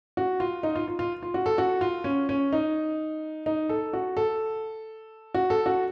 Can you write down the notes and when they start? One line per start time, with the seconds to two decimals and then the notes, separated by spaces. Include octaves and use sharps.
0.17 F#4
0.40 F4
0.63 D#4
0.75 F4
0.88 F4
0.99 F4
1.23 F4
1.34 F#4
1.46 A4
1.58 F#4
1.81 F4
2.04 C#4
2.29 C#4
2.53 D#4
3.46 D#4
3.69 A4
3.93 F#4
4.17 A4
5.34 F#4
5.50 A4
5.66 F#4